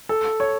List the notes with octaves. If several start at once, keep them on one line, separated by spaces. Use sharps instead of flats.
A4
C#5